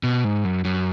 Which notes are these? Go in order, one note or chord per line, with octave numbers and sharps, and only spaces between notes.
B2
G#2
F#2
F#2